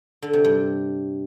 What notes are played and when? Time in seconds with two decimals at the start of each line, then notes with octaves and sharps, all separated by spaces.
0.22 D3
0.33 C3
0.44 G2